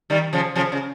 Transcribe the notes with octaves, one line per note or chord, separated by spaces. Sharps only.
D#3 G3
C#3 F3
C#3 F3
C#3